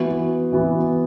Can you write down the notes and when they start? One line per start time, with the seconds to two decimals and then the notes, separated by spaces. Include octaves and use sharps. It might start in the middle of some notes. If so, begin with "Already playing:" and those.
Already playing: E3 B3 F#4
0.52 E3 B3 F#4